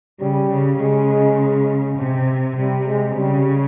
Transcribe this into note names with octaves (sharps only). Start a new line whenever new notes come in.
C#3 G3
C#3
C#3 G#3
C3
C3 G3
G#3
C#3 G3